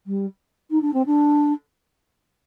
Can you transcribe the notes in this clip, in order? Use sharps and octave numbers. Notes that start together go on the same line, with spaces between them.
G3
D#4
D4
C4
D4